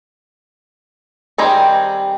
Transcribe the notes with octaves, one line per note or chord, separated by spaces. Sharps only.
D#3 G3 C4 G#4 A#5